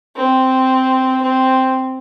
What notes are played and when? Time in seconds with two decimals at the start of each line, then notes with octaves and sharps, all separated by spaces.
0.17 C4
1.22 C4